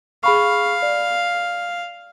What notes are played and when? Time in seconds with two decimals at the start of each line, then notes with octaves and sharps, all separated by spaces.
0.24 G#4 F5 B5 C#6
0.83 D5